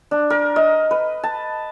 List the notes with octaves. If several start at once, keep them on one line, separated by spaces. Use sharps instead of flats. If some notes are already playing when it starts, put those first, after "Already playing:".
D4
A#4
D#5
B4
A5